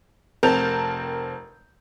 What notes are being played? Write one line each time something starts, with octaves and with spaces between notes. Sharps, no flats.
F1 C4 A#4 A5 G6 F7